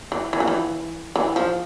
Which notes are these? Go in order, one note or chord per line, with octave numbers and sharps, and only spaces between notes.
E3
E3
F3
E3
E3
F3